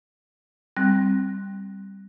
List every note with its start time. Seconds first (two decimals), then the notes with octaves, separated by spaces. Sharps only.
0.76 G3 C4 F#6